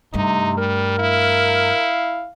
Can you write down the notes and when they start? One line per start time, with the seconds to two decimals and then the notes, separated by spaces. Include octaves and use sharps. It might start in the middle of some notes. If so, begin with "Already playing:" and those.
0.14 G2 C3 A3 D#4
0.57 G3 A#4
0.99 E4 F5